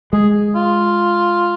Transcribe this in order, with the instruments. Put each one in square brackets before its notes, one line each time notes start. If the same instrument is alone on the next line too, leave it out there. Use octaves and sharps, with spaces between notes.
[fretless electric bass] G#3 [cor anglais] G#4
[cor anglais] F4